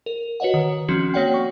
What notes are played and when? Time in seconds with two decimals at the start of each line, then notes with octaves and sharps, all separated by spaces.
0.06 A#4
0.40 F#4 B4 C#5 D#5 F#5
0.54 D#3
0.88 F3 C4 C#4 F#4
1.14 A#3 F#4 C#5 D5 F#5 G5
1.34 C#6